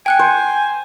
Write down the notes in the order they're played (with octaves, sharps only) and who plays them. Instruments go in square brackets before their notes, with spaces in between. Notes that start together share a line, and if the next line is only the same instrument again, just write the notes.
[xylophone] G5 F#6 C#7 [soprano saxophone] G#5
[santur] C5